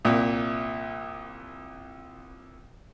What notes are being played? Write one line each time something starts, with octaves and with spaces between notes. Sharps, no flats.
C2 A#2